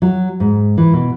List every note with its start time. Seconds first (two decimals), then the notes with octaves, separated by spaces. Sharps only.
0.02 F#3
0.40 G#2
0.78 E3
0.93 B2